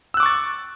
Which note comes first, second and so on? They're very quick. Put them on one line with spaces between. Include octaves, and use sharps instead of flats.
E6 F#6 D6 C#6 A6